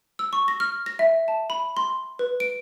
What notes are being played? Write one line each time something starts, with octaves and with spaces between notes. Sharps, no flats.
E6
C#6
A#6
F6
A#6
E5
A5
B5
C6
B4
D7